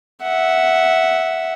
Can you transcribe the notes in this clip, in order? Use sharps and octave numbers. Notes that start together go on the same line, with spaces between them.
E5 F#5